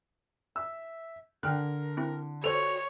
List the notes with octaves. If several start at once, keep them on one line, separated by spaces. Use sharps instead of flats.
E5 E6
D3 A#4 G5 F6 F#6
C4 E4
F#4 A4 C5 C#5 F7